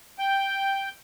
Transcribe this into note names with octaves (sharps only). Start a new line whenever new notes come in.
G5